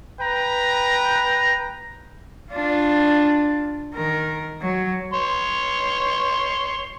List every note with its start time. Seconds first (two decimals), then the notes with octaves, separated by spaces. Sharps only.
0.21 B4 G5 A#5
2.53 D4 F4
3.94 D#3 A#4
4.62 F#3
5.13 C#5 C6